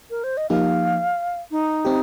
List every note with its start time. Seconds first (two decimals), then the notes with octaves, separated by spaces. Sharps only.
0.10 A#4
0.24 C5
0.37 D#5
0.50 F3 A#3 D#4 G4 F5
1.51 D#4
1.85 C4 G4